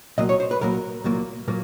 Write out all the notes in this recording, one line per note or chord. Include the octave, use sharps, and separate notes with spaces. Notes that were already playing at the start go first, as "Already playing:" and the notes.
C2 A#2 F#3 A#3 D#5
C#5
C5
B4
C2 A#2 F#3 A#3 A#4
C2 A#2 F#3 A#3
A#2 F#3 A#3